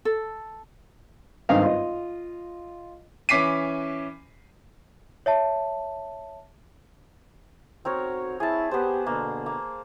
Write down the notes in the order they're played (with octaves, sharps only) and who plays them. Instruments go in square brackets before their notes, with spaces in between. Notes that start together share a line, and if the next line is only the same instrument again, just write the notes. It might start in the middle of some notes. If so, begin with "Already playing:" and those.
[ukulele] A4
[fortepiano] G#1 G2 D#4 F5
F4 D#5
[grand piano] E3 C#4 D6 B6 C7 D#7
[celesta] C#5 E5 A5
[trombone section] B1 F#4 [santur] C4 A#4 C#5
[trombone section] E4 [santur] G#4 A5
[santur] B3 C5 [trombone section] G4
[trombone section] B2 D3 [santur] A#3
[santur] A#3